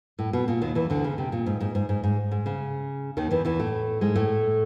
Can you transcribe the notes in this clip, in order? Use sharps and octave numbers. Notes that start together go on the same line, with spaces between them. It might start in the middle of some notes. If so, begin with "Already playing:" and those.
A2
B2
A#2
D#2 D#3
E2 E3
D2 D3
C#3
C3
A#2
G#2
G#2
G#2
G#2
G#2
G#2
C#3
D#2 D#3
E2 E3
E2 E3
A2 A3
G#2 G#3
A2 A3